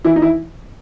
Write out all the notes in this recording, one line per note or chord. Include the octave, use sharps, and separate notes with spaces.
E3 E4
D#4
E3 E4